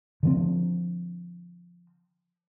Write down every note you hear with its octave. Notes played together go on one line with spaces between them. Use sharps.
D3 F3 C4